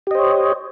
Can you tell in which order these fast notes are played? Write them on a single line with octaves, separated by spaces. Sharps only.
G4 D#5 C5 C#5